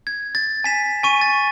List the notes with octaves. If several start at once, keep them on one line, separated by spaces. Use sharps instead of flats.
G#6
A6
G#5 B6 E7
G#5 C#6 D#7
A6